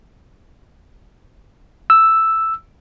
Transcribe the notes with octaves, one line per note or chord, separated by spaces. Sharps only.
E6